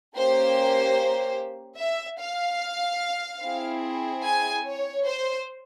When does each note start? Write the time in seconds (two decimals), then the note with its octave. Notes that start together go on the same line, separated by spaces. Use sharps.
0.17 A#3 C#4 G4 C5
1.80 E5
2.20 F5
3.43 C4 E4 G#4
4.24 G#5
4.65 C#5
5.06 C5